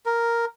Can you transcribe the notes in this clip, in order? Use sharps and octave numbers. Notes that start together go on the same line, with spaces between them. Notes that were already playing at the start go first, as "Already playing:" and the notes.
A#4